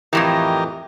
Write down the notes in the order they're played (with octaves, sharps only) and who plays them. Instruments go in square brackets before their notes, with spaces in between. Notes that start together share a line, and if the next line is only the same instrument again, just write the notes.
[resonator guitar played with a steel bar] F2 A2 E3 [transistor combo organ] G4 A#4 D#5